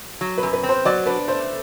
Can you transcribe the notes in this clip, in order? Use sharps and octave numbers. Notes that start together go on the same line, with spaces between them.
F#3
B4
F#2
B4
C4
C5
F#3 D5
D4 B4
A3 C5